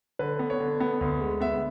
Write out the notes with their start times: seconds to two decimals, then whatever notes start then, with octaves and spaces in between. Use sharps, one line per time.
0.19 D3 B4
0.39 B3
0.50 C#5
0.60 D3
0.80 B3
1.01 D2
1.21 G#3
1.41 B3 E5